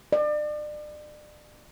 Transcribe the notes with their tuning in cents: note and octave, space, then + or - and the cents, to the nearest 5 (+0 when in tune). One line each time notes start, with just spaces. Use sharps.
D5 +35